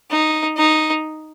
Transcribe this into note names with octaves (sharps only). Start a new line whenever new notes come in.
D#4
D#4